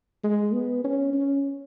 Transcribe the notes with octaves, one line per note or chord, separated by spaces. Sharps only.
G#3
B3
C#4
C#4